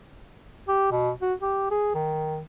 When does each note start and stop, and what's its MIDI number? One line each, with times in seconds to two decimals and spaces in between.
0.68 0.90 67
0.92 1.10 47
1.22 1.34 66
1.42 1.67 67
1.71 1.92 68
1.95 2.41 51